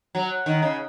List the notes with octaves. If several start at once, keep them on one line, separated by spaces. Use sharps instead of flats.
F#3
D#3
C#3